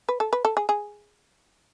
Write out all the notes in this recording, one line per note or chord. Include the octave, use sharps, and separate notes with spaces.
B4
A4
B4
A4
G#4
G#4